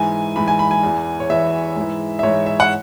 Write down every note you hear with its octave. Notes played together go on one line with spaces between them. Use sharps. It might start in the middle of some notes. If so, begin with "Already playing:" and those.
Already playing: G#2 E3 G#5
G#2 E3 B5
G#5
B5
G#5
E2 E3
C#5
E2 E3 E5
G#2 E3
E5
G#2 E3 C#5
E5
F#5